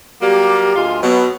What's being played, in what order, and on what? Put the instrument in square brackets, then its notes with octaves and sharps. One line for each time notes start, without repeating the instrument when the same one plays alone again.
[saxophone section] F#3 G3 A#3 [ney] G4
[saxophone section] D2 G#3 F4
[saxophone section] B2 F#3 [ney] B3